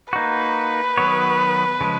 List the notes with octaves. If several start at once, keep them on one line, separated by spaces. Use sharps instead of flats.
A#3 D#4 F#4 B4
D#3 F#3 B3 F#4 C#5
C#3 F3 G#3